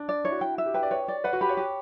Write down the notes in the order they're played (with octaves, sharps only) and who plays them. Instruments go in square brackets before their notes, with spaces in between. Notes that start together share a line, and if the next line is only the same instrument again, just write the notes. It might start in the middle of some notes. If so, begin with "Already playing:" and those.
Already playing: [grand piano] D4
[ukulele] D5
[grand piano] E4 [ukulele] C#5
[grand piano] F#4
[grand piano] E4 [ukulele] G5
[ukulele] E5
[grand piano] G4
[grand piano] B4 [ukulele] G5
[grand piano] D5
[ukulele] B4 [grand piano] C#5
[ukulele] D5
[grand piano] B4 [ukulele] F#5
[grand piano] F#4
[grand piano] G4 [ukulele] B5
[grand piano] C#5
[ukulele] G4